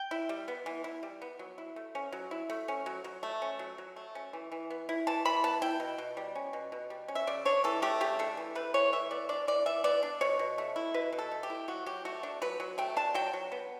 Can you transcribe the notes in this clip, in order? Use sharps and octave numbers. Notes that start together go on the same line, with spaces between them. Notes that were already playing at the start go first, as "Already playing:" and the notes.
Already playing: G5
E4
G3
B3
E3
E4
G3
B3
F#3
E4
A3
C#4
F#3
E4
A3
C#4
F#3
F#3
A3
C#4
F#3
F#3
A3
C#4
E3
E3
B3
E4
E3 A5
E3 B5
B3 A5
E4 G5
B2
B2
G3
C#4
B2
B2
G3
C#4
E5
C#3 D5
D4 C#5
E3 A4
A3 G4
C#3 G4
D4 A4
E3
A3 B4
E3 C#5
E3 E5
B3 D5
D4 D5
E3 D5
E3 E5
B3 D5
D4
B2 C#5
B2
A3
E4
B2 B4
B2
A4
A3
G4
E4
F#3 F#4
F#3 G4
A3 F#4
D4
F#3 B4
F#3
A3 G5
D4 A5
F#3 G5
F#3
B3